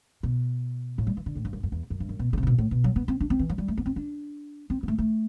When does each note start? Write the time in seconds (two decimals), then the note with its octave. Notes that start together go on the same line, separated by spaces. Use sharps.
0.23 B2
0.98 A2
1.07 G3
1.17 E3
1.26 D3
1.35 A2
1.45 G2
1.53 F#2
1.63 F#2
1.72 E2
1.90 F#2
2.00 G2
2.09 F#2
2.19 B2
2.33 D3
2.38 C3
2.43 A2
2.47 B2
2.58 A2
2.71 B2
2.84 F#3
2.96 B3
3.08 C4
3.20 D4
3.30 C4
3.39 E3
3.49 F#3
3.58 G3
3.68 A3
3.78 B3
3.86 C4
3.96 D4
4.70 C4
4.83 B3
4.88 A3
4.98 A3